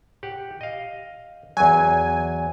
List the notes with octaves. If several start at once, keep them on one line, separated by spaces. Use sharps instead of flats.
G4 F#5
D#5 F5
E2 F#3 G#5